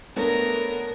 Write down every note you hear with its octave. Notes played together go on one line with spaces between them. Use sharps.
A3 B3 D4 A#4 C#5